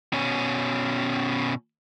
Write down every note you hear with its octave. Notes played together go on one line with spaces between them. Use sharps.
B2 C#4